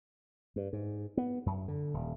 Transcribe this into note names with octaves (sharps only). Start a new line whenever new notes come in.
G2
G#2
B3
F#2
D3
D#1